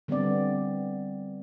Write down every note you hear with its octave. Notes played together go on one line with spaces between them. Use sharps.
D3 G3 B3 C4 D5